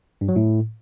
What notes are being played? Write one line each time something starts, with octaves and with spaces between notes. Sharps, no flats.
G2
F#3
A2